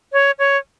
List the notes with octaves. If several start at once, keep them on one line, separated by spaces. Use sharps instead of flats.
C#5
C#5